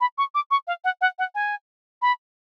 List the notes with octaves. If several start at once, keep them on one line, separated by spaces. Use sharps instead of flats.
B5
C#6
D6
C#6
F5
F#5
F#5
F#5
G#5
B5